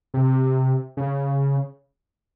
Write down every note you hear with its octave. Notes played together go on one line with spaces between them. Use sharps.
C3
C#3